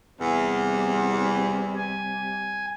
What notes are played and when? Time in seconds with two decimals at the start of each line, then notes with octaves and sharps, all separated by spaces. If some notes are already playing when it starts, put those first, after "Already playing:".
0.20 E2 C3 G3
1.76 G#5